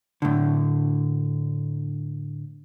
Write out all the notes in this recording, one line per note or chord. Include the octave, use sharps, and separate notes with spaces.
A2 D3